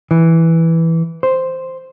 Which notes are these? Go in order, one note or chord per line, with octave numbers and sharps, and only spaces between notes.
E3
C5